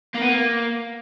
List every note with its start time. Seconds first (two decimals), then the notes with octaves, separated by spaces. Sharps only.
0.14 A#3
0.21 B3
0.29 A#3